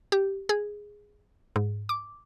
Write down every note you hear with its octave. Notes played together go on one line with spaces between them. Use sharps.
G4
G#4
G#2
D6